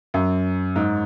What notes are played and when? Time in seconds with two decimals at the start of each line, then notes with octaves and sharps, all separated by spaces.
0.14 F#2
0.76 G#2